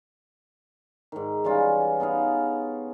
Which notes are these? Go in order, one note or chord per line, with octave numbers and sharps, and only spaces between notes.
G#2 D#3
E3 G3 C#4 F4
B3 D#4 G#4 F5